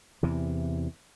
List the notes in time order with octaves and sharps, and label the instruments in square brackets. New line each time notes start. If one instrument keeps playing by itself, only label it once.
[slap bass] E2 C3 E3